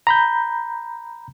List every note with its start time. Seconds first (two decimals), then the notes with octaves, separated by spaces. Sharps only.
0.07 A#5 B5 G6